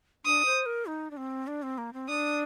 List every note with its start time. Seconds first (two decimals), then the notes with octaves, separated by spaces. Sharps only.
0.25 D4 D#6
0.45 C5
0.66 A#4
0.86 D#4
1.11 D4
1.17 C4
1.47 D4
1.63 C4
1.78 A#3
1.93 C4
2.08 D4 D#6